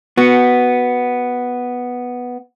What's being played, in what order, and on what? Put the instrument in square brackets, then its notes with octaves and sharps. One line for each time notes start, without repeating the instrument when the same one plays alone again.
[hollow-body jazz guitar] B3 F#4